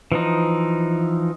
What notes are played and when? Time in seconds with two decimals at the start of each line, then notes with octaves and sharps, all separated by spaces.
0.12 E3 F3 D#4